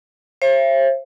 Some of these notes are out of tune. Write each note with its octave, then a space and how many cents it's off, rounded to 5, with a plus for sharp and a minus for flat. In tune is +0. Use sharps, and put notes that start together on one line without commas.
C5 +40 E5 +40